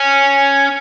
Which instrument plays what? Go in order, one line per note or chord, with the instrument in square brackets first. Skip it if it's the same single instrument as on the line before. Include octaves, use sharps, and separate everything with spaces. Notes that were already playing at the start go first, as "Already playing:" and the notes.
Already playing: [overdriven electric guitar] C#4